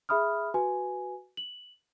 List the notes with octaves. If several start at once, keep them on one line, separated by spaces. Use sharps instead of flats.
G#4 E5 B5 D#6 F6
F#4 B4 G#5
F#7